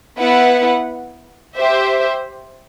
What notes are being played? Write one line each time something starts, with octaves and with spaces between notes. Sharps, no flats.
B3 E4 B4 F#5
G4 C5 E5